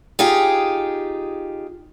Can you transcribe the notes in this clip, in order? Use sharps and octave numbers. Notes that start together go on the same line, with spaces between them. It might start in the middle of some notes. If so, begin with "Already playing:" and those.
D#4 F4 G4 G#4